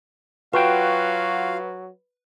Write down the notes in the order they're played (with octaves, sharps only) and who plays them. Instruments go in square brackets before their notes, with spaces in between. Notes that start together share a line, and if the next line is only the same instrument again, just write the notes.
[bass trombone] F#3 [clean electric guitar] F4 F#4 G5 [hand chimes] B4 [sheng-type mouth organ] F5